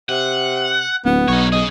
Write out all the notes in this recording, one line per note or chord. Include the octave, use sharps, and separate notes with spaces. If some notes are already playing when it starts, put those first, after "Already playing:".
C3 F#5
D1 B3
B1 D#4 C#5
C#3 G#4 D#5